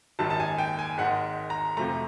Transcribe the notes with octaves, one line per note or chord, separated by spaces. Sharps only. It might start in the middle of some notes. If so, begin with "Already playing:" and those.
G#1 F#2 D#3 G3 A5
A5
G#5
G5
G#5
G#1 G#2 D#3 F#5
A#5
F2 C3 F3 A3 A#5